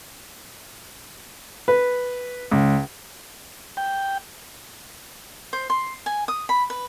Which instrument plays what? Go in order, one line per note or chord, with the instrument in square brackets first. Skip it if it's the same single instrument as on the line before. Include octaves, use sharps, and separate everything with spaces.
[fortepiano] B4
C#2
[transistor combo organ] G5
[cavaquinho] C5
C6
G#5
D#6
B5
B4